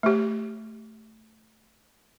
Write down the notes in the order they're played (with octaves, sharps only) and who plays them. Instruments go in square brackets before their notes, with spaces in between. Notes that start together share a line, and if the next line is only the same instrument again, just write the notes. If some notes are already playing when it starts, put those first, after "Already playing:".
[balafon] A3 G4